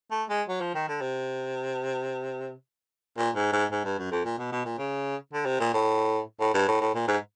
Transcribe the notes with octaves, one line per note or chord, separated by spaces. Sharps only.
A3
G#3
F#3
F3
D#3
D3
C3
A#2
G#2
G#2
G#2
G2
F#2
F2
A#2
B2
B2
A#2
C#3
D3
C3
A#2
A2
A2
G2
A2
A2
A#2
G#2